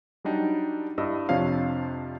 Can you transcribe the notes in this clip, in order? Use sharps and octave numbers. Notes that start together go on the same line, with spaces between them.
F#3 G3 D4 D#4 G4
G2 G3 E4 D#5 E6
F2 C3 F3 D4 C#5 F5